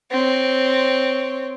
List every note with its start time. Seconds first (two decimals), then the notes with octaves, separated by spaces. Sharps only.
0.11 C4 C#5